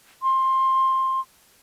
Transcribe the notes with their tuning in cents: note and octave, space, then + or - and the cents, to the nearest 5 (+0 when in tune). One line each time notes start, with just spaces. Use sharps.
C6 +15